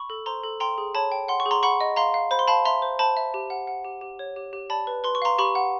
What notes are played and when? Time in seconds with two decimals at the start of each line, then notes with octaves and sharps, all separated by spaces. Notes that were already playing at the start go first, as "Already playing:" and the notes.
Already playing: B5 C#6
0.10 A4
0.26 C5 A#5 C6
0.44 A4
0.60 G5 A#5 C6
0.78 G#4
0.95 C#5 A5 B5
1.12 G5
1.28 F#5 C6
1.40 C#6
1.46 G#4
1.51 A#5 C6
1.63 F#5 B5 C#6
1.81 D#5
1.96 F5 A#5 C6
2.14 F5
2.31 C5 B5
2.39 C6
2.47 F5 A5 B5
2.65 E5 A#5 C6
2.82 C5
2.99 C5 A5 B5
3.17 E5
3.34 G4
3.50 F#5
3.67 F#5
3.84 G4
4.01 G4
4.19 C#5
4.36 G4
4.53 G4
4.70 D5 A5 B5
4.87 B4
5.04 B4 C6
5.15 C#6
5.22 F5 A#5 C6
5.38 G4 B5 C#6
5.55 F#5